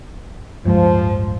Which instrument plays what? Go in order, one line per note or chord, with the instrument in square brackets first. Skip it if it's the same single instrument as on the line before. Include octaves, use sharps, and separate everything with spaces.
[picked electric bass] D1 G2 G#3 [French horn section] F3